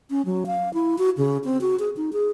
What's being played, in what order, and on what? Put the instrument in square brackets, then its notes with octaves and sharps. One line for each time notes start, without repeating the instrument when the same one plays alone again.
[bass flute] C#4
F#3
F5
E4
F#4
C#3
C4
F#4
G#4
D#4
G#4